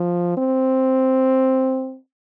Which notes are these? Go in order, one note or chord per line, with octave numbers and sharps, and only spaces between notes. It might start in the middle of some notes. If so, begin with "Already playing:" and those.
Already playing: F3
C4